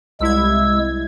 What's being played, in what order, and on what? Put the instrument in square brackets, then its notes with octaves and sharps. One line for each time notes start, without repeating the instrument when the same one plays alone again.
[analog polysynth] C2 E4 G#6 [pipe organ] G#3 E6